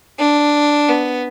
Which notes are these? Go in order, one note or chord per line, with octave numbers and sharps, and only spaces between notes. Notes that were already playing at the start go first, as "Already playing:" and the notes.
D4
B3